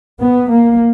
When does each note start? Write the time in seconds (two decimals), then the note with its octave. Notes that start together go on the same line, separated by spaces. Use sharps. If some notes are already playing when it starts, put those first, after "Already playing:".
0.21 B3
0.50 A#3